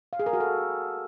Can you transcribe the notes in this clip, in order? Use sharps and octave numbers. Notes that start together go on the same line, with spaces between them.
F5
G#4
A#4
F#4
A4